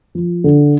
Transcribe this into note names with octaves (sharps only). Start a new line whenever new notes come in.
F3
D3